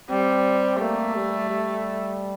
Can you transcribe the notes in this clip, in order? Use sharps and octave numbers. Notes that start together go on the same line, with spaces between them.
G3 C4
A3 A#3
G3
G3